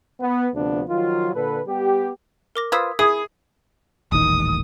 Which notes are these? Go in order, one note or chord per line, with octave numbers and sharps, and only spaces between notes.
B3
D2 C3 F3 B3 D4
D#3 F3 F#3 F4
A#2 D3 A4 B4
G3 B3 G4
A#4 D6 A#6
F4 B4 C5 D#6 E6 G#6
E4 G#4 D#6
D#1 A1 D#3 D#6